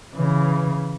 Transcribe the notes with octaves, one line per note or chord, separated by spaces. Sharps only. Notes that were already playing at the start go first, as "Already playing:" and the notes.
C#3 E3